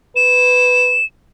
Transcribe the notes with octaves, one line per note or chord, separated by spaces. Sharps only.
B4 E7